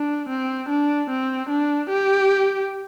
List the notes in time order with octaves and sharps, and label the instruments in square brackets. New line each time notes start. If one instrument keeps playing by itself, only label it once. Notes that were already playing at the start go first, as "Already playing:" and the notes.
Already playing: [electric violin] D4
C4
D4
C4
D4
G4